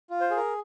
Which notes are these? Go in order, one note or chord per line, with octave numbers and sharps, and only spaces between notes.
F4
C5
G#4
A#4